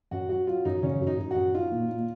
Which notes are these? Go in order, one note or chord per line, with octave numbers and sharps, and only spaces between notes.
F#2 F#4
F#3 F#4
F#3 F4
F#2 D#4
C#3 C#4
F#2
D#4
F#2
F#4
F#2
D#4 F4
A#2
A#2